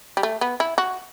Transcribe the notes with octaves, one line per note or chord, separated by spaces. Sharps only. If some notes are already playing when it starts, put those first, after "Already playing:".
G3
A3
B3
E4
F#4